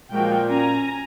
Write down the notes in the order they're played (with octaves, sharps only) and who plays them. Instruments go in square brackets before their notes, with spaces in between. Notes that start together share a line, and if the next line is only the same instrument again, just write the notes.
[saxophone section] A#2 [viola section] F3 F#4 G5 [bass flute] G#3
[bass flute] C#4 [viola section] G#5 A#5